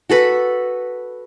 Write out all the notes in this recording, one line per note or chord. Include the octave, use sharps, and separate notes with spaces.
F#4 A4 B4